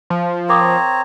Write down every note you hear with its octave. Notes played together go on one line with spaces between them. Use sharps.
F3
C4 A#4 C#5 A#5 D6 D#6